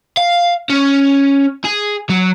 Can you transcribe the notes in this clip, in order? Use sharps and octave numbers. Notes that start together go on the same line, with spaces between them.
F5
C#4
G#4
F#3